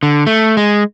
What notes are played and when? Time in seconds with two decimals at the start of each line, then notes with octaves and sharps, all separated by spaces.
0.03 D3
0.27 A3
0.57 G#3